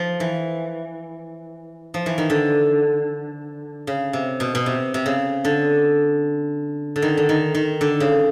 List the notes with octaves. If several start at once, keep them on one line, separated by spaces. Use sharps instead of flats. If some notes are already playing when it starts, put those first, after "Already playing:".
Already playing: F3
E3
F3
E3
D#3
D3
C#3
C3
B2
B2
C3
C3
C#3
D3
D3
D#3
D3
D#3
D#3
D3
C#3